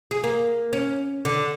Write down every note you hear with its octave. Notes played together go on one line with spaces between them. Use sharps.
G#4
A#3
C#4
D3